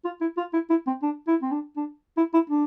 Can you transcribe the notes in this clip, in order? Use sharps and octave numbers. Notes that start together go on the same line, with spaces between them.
F4
E4
F4
E4
E4
C4
D4
E4
C4
D4
D4
E4
E4
D4